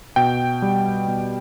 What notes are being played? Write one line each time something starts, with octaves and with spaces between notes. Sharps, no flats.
B2 G5
G3
B2